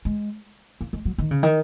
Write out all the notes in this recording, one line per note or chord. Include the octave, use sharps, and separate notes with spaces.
G#3
A#3
G#3
F#3
D#3
C#3
D#3